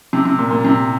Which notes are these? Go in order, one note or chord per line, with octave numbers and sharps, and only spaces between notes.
C3
C3
A#2
A#2
C3